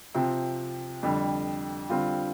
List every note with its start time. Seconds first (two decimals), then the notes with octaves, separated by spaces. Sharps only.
0.15 C3 F3 C4
1.03 F2 D3 G3
1.90 D3 G3 C4 F4